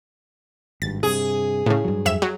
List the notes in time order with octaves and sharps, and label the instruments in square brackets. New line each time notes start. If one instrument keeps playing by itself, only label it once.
[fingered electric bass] G#1 G2 [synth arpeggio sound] A6
[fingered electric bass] G2 C3 [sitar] G#4
[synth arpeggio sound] A2 C#3
[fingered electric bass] G2 F#3
[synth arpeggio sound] F2 E5 E7
F#3